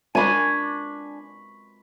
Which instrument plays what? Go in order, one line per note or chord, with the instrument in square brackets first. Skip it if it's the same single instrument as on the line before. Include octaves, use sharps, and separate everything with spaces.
[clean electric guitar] D4 G#5 [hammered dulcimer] B5 C#6